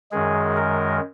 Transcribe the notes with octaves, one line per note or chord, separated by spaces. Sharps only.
F#2 D#3 G#3 G#4
A#4